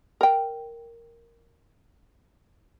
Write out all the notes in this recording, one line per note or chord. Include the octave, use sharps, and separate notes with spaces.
A#4 G5